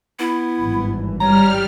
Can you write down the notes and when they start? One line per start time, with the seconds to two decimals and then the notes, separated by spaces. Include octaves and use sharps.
0.19 B3 E4
0.61 G#1 G2 E3
1.20 G3 C#5 A#5 F6